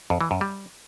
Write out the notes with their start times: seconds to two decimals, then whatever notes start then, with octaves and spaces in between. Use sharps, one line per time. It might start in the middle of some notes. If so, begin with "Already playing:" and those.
0.10 F2
0.21 E3
0.31 F#2
0.41 G3